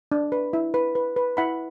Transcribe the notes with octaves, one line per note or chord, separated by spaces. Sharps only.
D4
B4
E4
B4
B4
B4
E4 F#5 B5